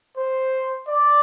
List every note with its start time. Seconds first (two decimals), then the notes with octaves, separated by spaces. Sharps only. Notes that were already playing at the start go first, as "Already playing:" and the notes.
0.18 C5
0.88 D5